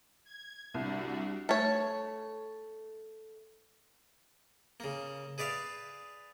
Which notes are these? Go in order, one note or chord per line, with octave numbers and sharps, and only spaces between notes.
G#6
C2 G3 D4 F#4
A3 C#5
C#3 A#3
G#4 B4 D5 E5 F5